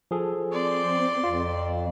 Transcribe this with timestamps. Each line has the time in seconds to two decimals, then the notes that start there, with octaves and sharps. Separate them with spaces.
0.11 F3 G#4 A4
0.53 C4 D5 C6
1.24 F2 F4